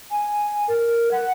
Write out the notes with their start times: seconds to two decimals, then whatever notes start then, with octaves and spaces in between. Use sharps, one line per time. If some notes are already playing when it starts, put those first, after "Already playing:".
0.11 G#5
0.68 A#4
1.12 F#5